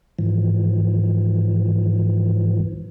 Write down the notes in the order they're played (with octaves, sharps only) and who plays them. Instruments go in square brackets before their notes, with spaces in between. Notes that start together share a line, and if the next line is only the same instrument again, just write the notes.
[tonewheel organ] G#2 E3 F3